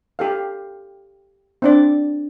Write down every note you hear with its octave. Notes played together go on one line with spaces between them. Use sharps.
G4 A4 F5
C4 D4 D5